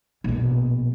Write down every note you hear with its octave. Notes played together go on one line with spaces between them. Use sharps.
A#1 B2